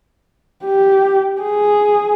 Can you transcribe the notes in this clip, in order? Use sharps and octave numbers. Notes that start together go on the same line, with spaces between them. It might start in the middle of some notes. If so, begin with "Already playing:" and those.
G4
G#4